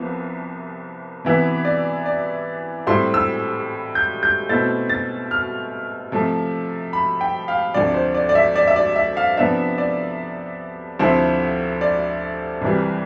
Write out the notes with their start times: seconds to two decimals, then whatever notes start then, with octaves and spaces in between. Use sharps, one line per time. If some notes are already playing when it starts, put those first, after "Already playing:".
Already playing: C2 C3 F3 B3
1.25 C3 E3 B3 E4
1.65 D5
2.06 D5
2.87 A2 G3 C4 E4 C6
3.14 E6
3.95 G6
4.23 G6
4.49 B2 A3 C4 E4 A6
4.89 A6
5.31 F6
6.12 C3 F3 A3
6.93 B5
7.21 G5
7.48 F5
7.74 D2 C3 F3 D5
7.94 C5
8.15 D5
8.29 D5
8.35 E5
8.56 D5
8.67 E5
8.76 D5
8.96 E5
9.17 F5
9.37 C3 F3 B3 D4 E5
9.78 D5
10.99 D2 C3 F3 C4 E4 C5
11.81 D5
12.61 C2 C3 E3 G3